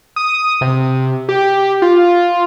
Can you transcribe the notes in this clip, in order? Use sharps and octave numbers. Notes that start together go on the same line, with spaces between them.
D#6
C3
G4
F4